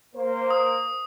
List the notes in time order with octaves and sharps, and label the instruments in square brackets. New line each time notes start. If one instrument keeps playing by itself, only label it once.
[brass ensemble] A#3 C5
[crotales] D#6